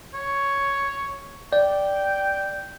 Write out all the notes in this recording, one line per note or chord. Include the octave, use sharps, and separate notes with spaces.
C#5
D5 G5